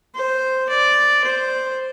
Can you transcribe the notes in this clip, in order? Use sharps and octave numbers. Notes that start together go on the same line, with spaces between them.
C5
D5
C5